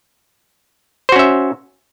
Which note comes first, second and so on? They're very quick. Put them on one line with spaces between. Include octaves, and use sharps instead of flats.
C5 F#4 C#4 E5